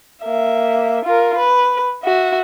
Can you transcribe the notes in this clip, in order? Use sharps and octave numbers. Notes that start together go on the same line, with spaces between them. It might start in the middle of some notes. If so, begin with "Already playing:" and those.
A#3 E5
F4 A#4
B4
F#4 E5